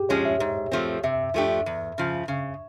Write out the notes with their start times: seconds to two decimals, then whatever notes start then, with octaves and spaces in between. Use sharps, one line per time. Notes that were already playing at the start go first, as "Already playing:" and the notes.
Already playing: G4 G#4
0.09 F3 G#3 C#4 C#5
0.25 E5
0.40 G#2
0.72 F3 A3 C4
1.03 C3 E5
1.34 F3 A3 D4 G4
1.66 E2
1.98 C#3 F3
2.28 C#3